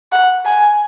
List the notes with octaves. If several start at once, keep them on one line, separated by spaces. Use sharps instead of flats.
F#5
G#5